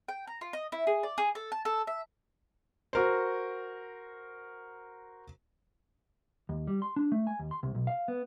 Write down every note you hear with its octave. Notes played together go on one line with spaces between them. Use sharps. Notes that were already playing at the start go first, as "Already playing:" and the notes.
G5
A#5
F4
D#5
E4
G#4
D5
G#4
A4
A5
A4
E5
F#4 A#4 C5
D#2
G3
C6
D4
A3
G#5
D#2
C6
C2
B1
F5
B3